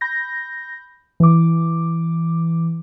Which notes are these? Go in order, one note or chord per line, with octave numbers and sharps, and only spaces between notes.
B5 G6 A#6
E3 D6